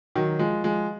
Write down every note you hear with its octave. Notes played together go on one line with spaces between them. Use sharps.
D#3 F#3
F3 G#3
F3 G#3